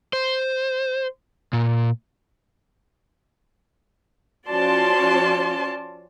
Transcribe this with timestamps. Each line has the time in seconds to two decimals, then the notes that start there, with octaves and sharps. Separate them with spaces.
0.13 C5
1.53 A#2
4.49 F3 C#4 F#4 D5 A5 C6